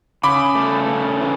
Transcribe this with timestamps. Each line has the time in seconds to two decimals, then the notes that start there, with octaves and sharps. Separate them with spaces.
0.23 C#3 B5 D6
0.55 A3
0.88 C#3
1.20 E3